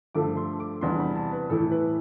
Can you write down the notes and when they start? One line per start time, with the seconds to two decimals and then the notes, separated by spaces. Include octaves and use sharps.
0.15 G2 D3 F3 A3 D6
0.37 C6
0.60 D6
0.81 E2 C3 G3 B3 D4 C6
0.99 B5
1.16 A5
1.32 B4
1.50 A2 E3 A3 E4 A4
1.71 B4